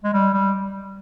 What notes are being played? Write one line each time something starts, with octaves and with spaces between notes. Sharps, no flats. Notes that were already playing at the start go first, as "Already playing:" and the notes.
G#3
G3
G3